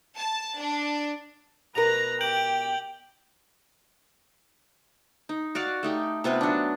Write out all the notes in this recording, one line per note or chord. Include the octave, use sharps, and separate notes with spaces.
A5
D4
B2 A#4 B4 A#5 A#6 F7
G4 G5 G6 D7 F#7
D#4
F#4 D5 F5
A3 D#4 G4
C3 B3 F4 B4
F#3 D4